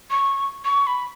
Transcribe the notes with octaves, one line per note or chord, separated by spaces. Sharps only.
C#6
C#6
B5